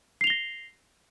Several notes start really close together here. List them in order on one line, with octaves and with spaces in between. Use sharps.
C7 F7 G7 A#6